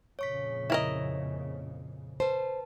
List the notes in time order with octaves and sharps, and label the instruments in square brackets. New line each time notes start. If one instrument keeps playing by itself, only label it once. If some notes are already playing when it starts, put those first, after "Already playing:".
[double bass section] F2 A#2 C#3 [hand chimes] C#5 C#6 B6
[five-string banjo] E4 A#4 D#5
[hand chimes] B4 A5 [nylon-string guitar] C5